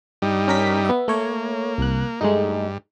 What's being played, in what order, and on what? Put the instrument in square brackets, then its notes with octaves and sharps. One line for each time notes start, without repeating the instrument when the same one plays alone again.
[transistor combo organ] G2 G3 D#4
[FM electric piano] C#4 A#4 B6
B3 E5
[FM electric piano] A3 C#5 [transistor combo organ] A#3
[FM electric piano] C2 F#6
[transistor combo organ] G2 [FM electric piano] G#3 A3 D#4